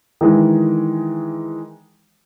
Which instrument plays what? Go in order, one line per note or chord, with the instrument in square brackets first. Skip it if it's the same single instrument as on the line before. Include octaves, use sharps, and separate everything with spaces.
[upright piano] D#3 E3 G#3